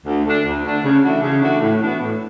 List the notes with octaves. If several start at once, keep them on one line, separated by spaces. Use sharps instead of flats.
D2
D3 A3 D4
D2
D3 A3 D4
C#3
E3 A3 D4 F#4
C#3
E3 A3 D4 F#4
A2
E3 B3 D4 F#4
A2